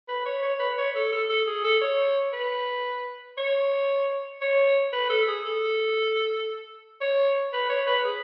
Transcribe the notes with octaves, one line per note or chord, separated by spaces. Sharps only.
B4
C#5
C#5
B4
C#5
A4
A4
A4
G#4
A4
C#5
B4
C#5
C#5
B4
A4
G#4
A4
C#5
B4
C#5
B4
G#4